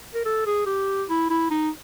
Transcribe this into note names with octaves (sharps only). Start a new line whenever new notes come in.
A#4
A4
G#4
G4
E4
E4
D#4